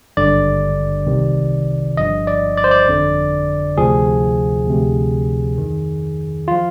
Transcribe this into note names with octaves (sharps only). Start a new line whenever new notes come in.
G#1 G2 D3 D5
C2 C3 D#3
G1 G2 F3 D#5
D5
D5
C5
D5
G1 F2 D3
D2 C3 F3 G#4
D2 C3 F3
F2 D#3
F3 F4